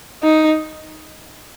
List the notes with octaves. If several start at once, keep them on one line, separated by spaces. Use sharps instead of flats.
D#4